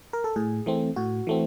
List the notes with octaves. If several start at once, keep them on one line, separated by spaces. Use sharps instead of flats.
A#4
A4
A2 G#4
E3 A3 C4
A2 F#4
E3 A3 C4